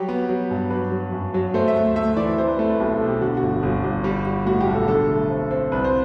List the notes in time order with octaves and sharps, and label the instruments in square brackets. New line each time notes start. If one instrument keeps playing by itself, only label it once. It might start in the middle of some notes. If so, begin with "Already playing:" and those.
Already playing: [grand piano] F#3 G3 G4
B3
F#3
G2
F#3 B4
F#3
F#2
F#3
A3 C5
E5
D2
A3 E5
E3 D5
C4 C5
B4
A3 C5
B4
B1 G4
A4
B2
G4
D3 F#4
F#4
G1
G1
G1
G3
G3
A2 F#4
G4
B1
A4
D3 A4
A3
C4
C4
C2 B4
C5